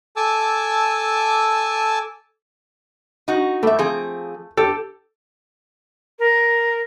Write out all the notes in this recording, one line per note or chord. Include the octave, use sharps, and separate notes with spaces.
A4 G#5 A5 D6 E6
D#4 F#4
G3 A3 E5
F3 C4 G#4
G4 A4
A#4